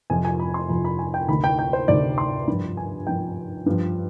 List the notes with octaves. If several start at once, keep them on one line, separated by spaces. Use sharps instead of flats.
F2 C3 F3 G#5
G#5
B5
C6
F2 C3 F3 B5
B5
G#5
G5
D2 C3 D#3 B5
G5
G5
C5
D2 C3 D#3 D5
C6
G2 F3 B5
G#5
G2 F3 G5
G2 F3